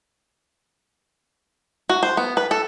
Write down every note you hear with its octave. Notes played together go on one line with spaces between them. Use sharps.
F#4
C5
B3
B4
A4